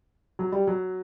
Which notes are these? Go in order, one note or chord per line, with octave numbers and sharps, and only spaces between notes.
F#3
G3
F#3